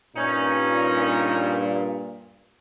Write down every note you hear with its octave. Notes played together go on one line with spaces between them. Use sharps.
G2 A#2 C#4 D#4